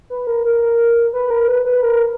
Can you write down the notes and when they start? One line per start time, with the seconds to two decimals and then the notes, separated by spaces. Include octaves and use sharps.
0.10 B4
0.27 A#4
0.45 A#4
1.13 B4
1.30 A#4
1.48 B4
1.65 B4
1.83 A#4